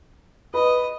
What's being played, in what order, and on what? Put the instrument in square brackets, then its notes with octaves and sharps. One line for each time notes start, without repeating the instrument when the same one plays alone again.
[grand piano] B4 B5 [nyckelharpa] D#5